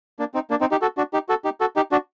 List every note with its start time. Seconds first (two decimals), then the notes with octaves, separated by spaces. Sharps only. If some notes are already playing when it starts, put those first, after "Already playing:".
0.19 A#3 D4
0.34 C4 D#4
0.50 A#3 D4
0.61 C4 D#4
0.71 D#4 G4
0.82 F#4 A4
0.97 D4 F#4
1.13 D#4 G4
1.29 F#4 A4
1.45 D#4 G4
1.60 F#4 A4
1.76 D#4 G4
1.92 D4 F#4